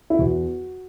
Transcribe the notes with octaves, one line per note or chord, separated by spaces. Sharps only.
E4
E2 F#4